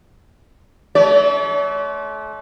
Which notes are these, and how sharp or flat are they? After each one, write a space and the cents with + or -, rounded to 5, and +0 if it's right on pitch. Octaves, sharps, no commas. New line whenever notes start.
A3 -35 C#5 +45